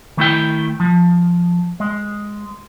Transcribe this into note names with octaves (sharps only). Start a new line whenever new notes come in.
D#3 A3 E4 G5
F3
G#3